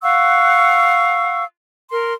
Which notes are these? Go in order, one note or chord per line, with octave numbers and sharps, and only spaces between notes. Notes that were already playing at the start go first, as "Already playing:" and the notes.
F5 F#5 C#6 E6
A#4 C6